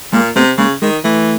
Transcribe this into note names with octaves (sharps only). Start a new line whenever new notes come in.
A#2 G#3 A#3
C3 A3 B3
C#3 G#3 A#3
D#3 G#3
E3 A3